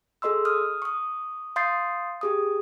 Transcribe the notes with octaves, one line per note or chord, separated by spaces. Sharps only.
G#4 A4 D#5 C6 E6
D#6 F6
C#6 D#6
F5 C6 D#6 G6 A6 C7
G4 G#4 D#6